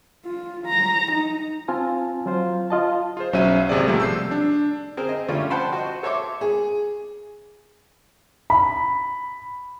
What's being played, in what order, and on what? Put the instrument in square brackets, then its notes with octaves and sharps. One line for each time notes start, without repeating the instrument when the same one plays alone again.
[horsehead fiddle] F4
A#5
D#4
[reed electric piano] C4 F4 G#5 A5
F#3 F4 C5
F4 D#5 A5
[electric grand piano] F4 G#4 C5
B1 F#3 C#4 C5 E5 D#7
G#1 C3 G#4 D5
B2 F3 G3 A3
E6 G6 C7
D4
[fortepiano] C4 G#4 A#4 C5
D#5
F3 G3 A3 C#4 D4 F4
C5 F#5 G5 A5 B5 C6
F#4 C5 D#5
A4 C#5 E5 C6 D6
[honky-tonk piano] G#4
[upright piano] B5